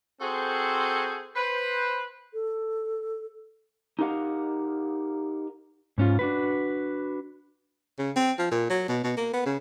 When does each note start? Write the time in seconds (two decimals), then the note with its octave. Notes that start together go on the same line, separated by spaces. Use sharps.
0.21 C4 F#4 G#4 A4 C5
1.35 B4 C5
2.34 A4
3.99 D#4 G4 A#4 F5 F#5
5.98 G#2 C#4 F4
6.19 D4 F#4 B4
7.99 C#3
8.16 C4
8.39 F3
8.52 A#2
8.70 F#3
8.88 B2
9.04 B2
9.17 A#3
9.34 B3
9.46 C#3